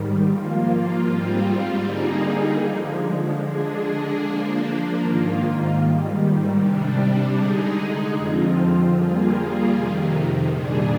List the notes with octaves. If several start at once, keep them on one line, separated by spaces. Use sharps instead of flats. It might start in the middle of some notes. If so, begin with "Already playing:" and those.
Already playing: G#2 D#3 G3
F3 A#3 F4
G#2 G3 C4 F4
D3 G3 A#3 D#4 G#4
D3 F3 G#3
D3 G#3 D4 G#4
F3 A#3 D4
G#2 D#3 A#3 F4
G#2 D#3 G3
C3 G3 D4
D3 G#3 D#4 G#4
F2 D3 F3 C4 F4
G3 A#3 F4 G#4
F2 C3 D#3
A#2 G3 D4 G#4